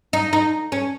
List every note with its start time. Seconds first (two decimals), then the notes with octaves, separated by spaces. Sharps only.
0.13 D#4
0.33 D#4
0.72 C#4